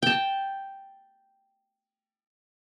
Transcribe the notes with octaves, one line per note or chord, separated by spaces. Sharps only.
G5 A5